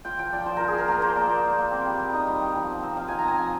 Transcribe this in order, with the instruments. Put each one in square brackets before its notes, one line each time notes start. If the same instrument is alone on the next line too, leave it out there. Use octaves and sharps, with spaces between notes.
[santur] F4 G5
F3 G5
F3 D5
F3 C5
F4 A#4
G#4
F4 A#4
A#3 A#4
A#3 C5
A#3 D5
F4
F4
A#3
C4
G3
G3
D#4 D#5
G3
G3
F3
C4
C4
D#4 F5
F3 G#5
A#5
C4 G#5
F3